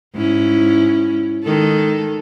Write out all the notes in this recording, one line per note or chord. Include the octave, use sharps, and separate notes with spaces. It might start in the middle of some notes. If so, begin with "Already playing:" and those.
G#2 C#4 E4
D#3 G#3 A4